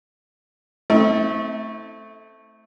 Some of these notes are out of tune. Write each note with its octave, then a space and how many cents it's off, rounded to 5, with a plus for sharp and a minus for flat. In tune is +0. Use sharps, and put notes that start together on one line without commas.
A3 +0 C4 +0 E4 -45